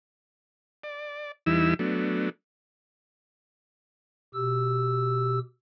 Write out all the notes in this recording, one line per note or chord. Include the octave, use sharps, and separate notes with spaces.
D5
E2 E3 G3 D#4 E4 E6
F#3 A3 B3 D4
B2 G4 E6